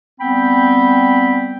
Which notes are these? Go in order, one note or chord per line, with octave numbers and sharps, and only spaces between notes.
G3 B3 C4 G5 B5